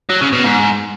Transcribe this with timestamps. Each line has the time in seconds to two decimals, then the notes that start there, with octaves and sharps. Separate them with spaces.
0.09 F#3
0.21 C#3
0.33 B2
0.44 G#2